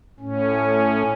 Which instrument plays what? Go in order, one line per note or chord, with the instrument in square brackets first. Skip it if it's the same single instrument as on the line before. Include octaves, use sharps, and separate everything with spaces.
[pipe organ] A2 C#4